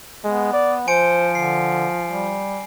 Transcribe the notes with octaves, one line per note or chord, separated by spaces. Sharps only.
G#3 B3
D5
F3 C5 G#5 C#7 D7
D3 C7
G3